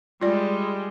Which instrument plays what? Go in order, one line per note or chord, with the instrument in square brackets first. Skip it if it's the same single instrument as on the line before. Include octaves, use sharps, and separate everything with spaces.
[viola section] G3 G#3 [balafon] F4 D5